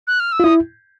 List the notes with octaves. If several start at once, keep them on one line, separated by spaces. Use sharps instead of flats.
F#6
F6
E6
F4
E4 D#6